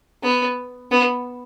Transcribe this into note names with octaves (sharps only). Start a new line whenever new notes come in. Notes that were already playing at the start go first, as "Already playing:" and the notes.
B3
B3